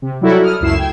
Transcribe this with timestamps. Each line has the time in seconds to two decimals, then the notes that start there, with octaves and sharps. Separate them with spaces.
0.02 C3
0.21 F#3 G3 E4 F#4 A4
0.43 D#6 F6
0.60 C#2 F#2 A3 E4 C7 E7
0.75 G5 G#6